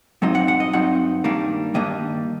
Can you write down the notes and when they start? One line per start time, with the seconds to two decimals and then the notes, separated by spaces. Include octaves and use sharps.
0.22 G2 F#3 C4 D#4 D#5
0.35 F#5
0.48 F#5
0.60 D#5
0.73 G2 F#3 C4 D#4 F#5
1.24 G2 D#3 G3 A#3 D4
1.74 G2 D#3 G3 A#3 D4 D#5